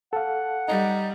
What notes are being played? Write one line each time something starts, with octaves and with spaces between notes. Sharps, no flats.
A4 F5 F#5
G3 D#4